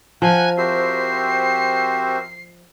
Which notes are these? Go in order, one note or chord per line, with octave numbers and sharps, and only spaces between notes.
F3 F#5 G#5 A#5 F#6 G6
C4 F#4 G4 A#4 C5 E5 C7